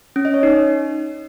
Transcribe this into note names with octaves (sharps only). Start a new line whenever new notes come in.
C#4
D#5
C#5
D#4